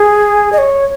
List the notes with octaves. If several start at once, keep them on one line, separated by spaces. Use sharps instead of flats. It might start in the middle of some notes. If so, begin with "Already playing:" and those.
Already playing: G#4
D#5
C#5